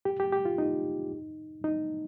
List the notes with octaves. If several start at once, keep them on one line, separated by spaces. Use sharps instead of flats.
G4
G4
G4
F4
D#4
D#4